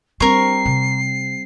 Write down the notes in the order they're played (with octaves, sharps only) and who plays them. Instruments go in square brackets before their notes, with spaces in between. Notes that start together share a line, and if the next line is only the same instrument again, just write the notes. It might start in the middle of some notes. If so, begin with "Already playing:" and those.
[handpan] G3 C4 [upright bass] D4 [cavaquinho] A#4 C#6 [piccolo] C7
[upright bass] C3